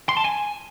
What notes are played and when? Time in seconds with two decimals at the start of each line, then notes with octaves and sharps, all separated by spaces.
0.09 C6
0.17 A5
0.25 G#5